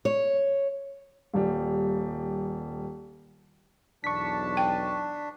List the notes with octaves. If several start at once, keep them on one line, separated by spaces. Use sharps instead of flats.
C#5
D#1 G3
B1 E2 D4 A5 C#6 B6
G5